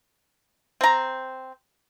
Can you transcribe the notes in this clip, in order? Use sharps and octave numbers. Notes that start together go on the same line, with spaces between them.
C4 A#5